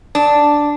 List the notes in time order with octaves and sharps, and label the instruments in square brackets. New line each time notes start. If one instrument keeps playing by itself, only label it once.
[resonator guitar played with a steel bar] D4